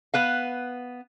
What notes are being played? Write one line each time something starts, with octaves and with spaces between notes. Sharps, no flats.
B3 B4 F5